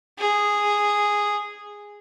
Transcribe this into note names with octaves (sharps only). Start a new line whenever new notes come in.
G#4